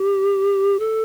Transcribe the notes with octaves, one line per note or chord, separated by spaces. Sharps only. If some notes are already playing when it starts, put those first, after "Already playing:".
Already playing: G4
A4